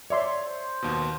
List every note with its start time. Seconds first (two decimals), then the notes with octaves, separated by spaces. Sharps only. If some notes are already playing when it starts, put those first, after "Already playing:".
0.10 C#5 D5 E5 C6
0.46 C5
0.82 D#2 B2